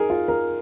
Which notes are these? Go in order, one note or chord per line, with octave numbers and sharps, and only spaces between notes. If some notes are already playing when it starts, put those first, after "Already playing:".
Already playing: D#4 G#4 A#4
F4
A#4